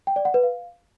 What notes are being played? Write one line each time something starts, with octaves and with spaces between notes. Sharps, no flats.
G5
D5
F#5
B4
F5